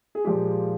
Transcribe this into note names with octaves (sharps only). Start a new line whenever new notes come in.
G#4
A#2 F3 G#3 G4